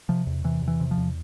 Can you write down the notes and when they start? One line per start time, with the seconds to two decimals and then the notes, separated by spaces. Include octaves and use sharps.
0.09 C3 F3
0.27 E2
0.44 C3 E3
0.62 E2
0.68 E3
0.80 C3
0.91 F3
0.97 E2